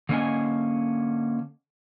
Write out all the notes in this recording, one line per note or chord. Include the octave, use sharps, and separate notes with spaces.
D3 A#3 C#4 D#5 G#5